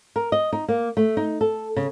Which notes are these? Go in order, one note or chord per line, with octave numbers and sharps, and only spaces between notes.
A#4
D#5
D#4
A#3
A3
D#4
A4
C#3